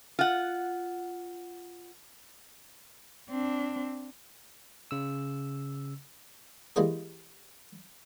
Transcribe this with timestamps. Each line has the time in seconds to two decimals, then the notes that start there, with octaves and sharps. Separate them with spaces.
0.19 F4 F#5
3.29 C4 D4
4.91 C#3 E6
6.76 E3 G3 G#3 A#3 C#4 G#4